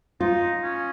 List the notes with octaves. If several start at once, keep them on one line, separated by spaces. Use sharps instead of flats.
D#4 F4
C#4